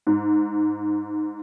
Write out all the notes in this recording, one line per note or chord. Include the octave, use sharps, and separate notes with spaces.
G#2